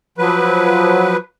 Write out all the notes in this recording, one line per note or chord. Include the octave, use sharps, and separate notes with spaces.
F3 F#3 B4